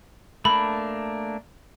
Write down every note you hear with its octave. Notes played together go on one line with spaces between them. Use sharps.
A3 A#3 D4 B5